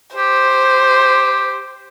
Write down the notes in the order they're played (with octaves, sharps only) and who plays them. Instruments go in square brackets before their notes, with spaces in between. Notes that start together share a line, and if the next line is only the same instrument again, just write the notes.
[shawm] G4 [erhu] C5